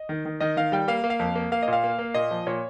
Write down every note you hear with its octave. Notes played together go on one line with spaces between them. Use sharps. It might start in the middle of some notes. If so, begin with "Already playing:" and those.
Already playing: D#5
D#3
D#3
D#3 D#5
D#3 F5
G3 G5
A#3 F5
A#3
F5
F2
A#3
A#3 F5
D#5
A#2
F5
A#3
A#3
A#2 D#5
F3
A#2 C#5